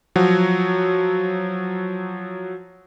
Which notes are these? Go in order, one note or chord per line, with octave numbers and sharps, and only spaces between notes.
F3 F#3 F#4 C#5